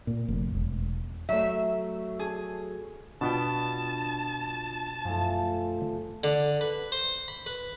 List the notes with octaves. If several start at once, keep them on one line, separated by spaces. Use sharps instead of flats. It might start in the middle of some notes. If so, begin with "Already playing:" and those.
A#2
F1
E1
F#3 A3 E5
G#4
B2 B3 D4 F4 G5 A5
F#2 F3 A3 G#5
D3
B4
C5
B5
B4